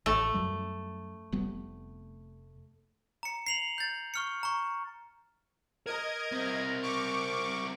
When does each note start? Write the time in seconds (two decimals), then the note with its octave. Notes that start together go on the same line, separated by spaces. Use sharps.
0.06 A1 A3
0.34 F#2 F#3 G3
1.32 F1 G3 B3
3.23 A#5 C#7
3.47 C7 F7 F#7
3.78 G6 A6
4.14 C#6 F6 C#7
4.43 A#5 C#6
5.86 A#4 D#5 A#5 G#6
6.32 C4 E4
6.82 C#6 D6